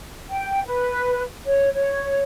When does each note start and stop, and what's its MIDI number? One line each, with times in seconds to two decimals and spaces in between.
0.29 0.61 79
0.66 1.23 71
1.46 1.69 73
1.75 2.22 73